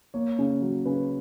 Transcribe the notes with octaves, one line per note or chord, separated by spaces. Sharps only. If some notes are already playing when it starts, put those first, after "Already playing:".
A#3 C#5
C#3
F#3
C#3 B4